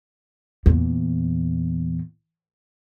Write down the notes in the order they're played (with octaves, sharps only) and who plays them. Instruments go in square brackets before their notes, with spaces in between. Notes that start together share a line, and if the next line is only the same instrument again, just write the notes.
[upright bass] E2 A#2